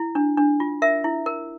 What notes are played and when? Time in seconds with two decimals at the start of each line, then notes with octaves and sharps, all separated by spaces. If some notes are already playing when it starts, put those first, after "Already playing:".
Already playing: E4
0.15 D4
0.38 D4
0.60 F4
0.82 A#4 E5
1.04 E4
1.26 A#4